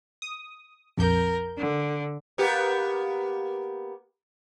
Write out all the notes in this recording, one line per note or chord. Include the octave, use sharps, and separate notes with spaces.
D#6
A#1 F2 A#4 G6
D3
A#3 B3 G4